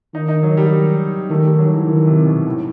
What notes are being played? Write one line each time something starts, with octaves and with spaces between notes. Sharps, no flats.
D#3 D#4
D#4
F#3
G3
D#3 A3
G3
F#3
E3
D#3 E3
C3
B2
A2